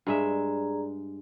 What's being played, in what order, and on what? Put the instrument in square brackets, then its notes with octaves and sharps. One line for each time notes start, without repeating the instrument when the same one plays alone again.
[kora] G2 G#3 E5 [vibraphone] G#4 D5 A#5